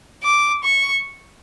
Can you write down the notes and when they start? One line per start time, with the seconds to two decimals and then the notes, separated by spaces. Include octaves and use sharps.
0.23 D6
0.64 C#6